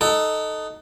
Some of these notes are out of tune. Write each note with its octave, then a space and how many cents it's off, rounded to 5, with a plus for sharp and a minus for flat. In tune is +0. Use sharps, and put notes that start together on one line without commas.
D#4 +0 A4 +0 F#5 +35